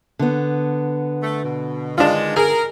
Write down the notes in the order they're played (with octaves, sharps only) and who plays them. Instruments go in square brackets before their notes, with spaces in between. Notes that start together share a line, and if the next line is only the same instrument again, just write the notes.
[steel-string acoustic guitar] D3 B3
[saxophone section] A3
B2
[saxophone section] D#3 G#3 [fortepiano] D4 F4
[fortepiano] G#4 [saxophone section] A#4